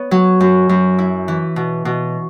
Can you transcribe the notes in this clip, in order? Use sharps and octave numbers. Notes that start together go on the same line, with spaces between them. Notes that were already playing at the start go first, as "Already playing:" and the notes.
Already playing: B3 C#5
F#3
F#2
F#2
E4
E3
B2
B2